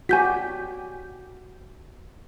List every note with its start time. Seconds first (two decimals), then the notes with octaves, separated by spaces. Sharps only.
0.09 F#4 G4 G#5 G6 B6